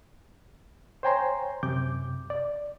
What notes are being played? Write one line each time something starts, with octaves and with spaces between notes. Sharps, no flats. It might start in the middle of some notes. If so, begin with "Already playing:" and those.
C5 C#5 G5 G#5 A#5 C6
F#2 C3 D6 G6
D5